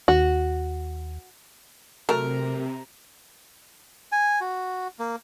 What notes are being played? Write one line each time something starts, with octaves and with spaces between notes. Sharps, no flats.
D#2 F#4
C3 F#3 A3 A#4 A#5
G#5
F#4
A#3